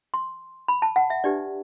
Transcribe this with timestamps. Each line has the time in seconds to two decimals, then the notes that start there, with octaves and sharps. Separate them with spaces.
0.14 C6
0.68 B5
0.82 A5
0.96 F#5
1.10 E5
1.24 D4 G4 B4 D5